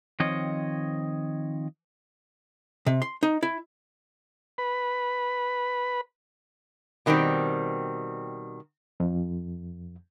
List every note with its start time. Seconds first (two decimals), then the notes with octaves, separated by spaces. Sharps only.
0.20 D#3 F3 C4 C#5 D#5
2.87 C3
3.02 C6
3.23 D#4
3.43 E4
4.58 B4 B5
7.06 B2 D#3 G3 A3 C4
9.00 F2